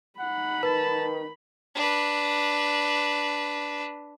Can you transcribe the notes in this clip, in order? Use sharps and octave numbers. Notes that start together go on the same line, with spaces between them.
D#4 F#5 B5
D#3 B4 A5
D4 B4